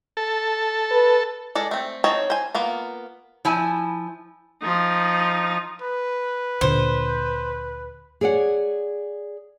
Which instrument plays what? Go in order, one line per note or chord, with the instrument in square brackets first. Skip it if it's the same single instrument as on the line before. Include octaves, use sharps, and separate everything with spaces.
[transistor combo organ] A4
[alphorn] B4
[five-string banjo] G#3 A4 D5
A3 C4
C4 D#4 C#5 A5
C5 G#5
A#3 B3 F4
[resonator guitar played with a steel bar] F3 E4 G#5
[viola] F3 D#4
[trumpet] B4
[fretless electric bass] D2 A#2 D3 [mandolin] C5
[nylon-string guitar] G#4 C#5 D5 E5 F#5